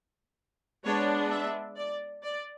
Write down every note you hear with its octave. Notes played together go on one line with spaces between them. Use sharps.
G#3 B3 D4 C#5
E5
D5
D5